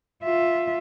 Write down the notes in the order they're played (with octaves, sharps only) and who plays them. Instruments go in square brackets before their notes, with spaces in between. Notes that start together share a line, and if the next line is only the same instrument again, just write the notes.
[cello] F4 E5